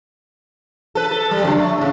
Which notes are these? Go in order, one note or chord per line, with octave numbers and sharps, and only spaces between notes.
A4 B4
A4
G3
F2 D3
A3
A2 C#3